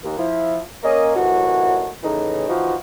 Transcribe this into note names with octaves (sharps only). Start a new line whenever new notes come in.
D#2
F3 E4
A#3 C#4 A#4 D#5
F#2 A2 C3 E3 D#4 F#4
A2 C#3 E3 D#4
E3 F3 D#4 F#4